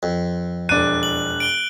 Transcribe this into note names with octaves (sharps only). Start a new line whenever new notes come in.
F2
E1 D4 F#6 D#7
F#7
D7 G7